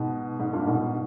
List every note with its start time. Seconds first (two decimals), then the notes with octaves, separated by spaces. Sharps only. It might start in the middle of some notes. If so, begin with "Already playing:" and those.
Already playing: G#2 B2
0.39 G#2
0.53 G2 A#2
0.67 G#2 B2